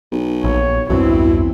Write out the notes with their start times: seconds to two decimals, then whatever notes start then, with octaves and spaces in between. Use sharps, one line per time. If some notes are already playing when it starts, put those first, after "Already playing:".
0.12 B1
0.44 A#1 C#5
0.89 B1 E2 G2 B2 C4 E4